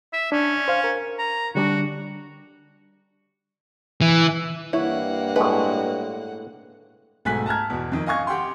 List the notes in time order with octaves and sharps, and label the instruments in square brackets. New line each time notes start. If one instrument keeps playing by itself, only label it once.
[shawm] E5
[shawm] C#4 [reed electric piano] D4
[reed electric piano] C5 F5
A#4
[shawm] A#5
[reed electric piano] D3 G3 D4 [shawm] F#4
[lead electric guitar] E3
[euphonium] G2 [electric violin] A#3 F#5 [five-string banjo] E4 [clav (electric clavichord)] C#5
[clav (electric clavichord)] A2 G#3 [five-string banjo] B4
[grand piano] B1 G#2 A3 G#5 F#6 B6
A5 A#5 F6 G#6
E2 B2
F2 D#3
D#5 F5 G#5 C#6 G#6
G4 F#5 G5 C6